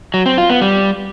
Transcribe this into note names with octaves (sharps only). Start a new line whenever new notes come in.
F#3
C4
F4
B3
G3